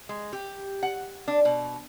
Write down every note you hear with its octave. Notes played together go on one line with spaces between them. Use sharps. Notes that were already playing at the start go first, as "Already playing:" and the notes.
G#3
G4
F#5
D4
B2